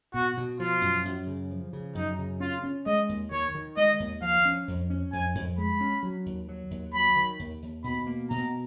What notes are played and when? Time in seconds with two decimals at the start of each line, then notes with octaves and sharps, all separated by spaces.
0.14 B2 F#4
0.37 B2
0.60 F3 F4
0.82 F#2
1.05 F#2
1.27 C#3
1.51 F3
1.73 C#3
1.95 F#2 D#4
2.19 C#3
2.40 C#4 F4
2.63 C#4
2.86 G#3 D#5
3.09 D#2
3.31 D#3 C#5
3.55 D#3
3.77 G#3 D#5
4.00 D#2
4.22 F3 F5
4.45 C#4
4.68 F2
4.90 C#4
5.12 F2 G#5
5.35 F2
5.58 G#3 B5
5.81 C#4
6.03 F#3
6.26 D#2
6.49 F#3
6.71 D#2
6.94 F#3 B5
7.16 D#3
7.39 D#2
7.63 D#2
7.84 B2 B5
8.07 A#3
8.30 B2 A#5